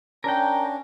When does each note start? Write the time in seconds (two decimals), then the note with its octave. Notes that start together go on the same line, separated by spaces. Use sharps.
0.24 C#4 D4 A#4 G5